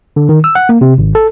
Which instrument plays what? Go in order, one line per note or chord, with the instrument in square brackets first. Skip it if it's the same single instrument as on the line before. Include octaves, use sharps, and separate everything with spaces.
[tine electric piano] D3
D#3
E6
F#5
A#3
C3
G#1
A4